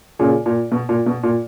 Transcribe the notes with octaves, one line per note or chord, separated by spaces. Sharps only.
A#2 C#3
A#2
B2
A#2
B2
A#2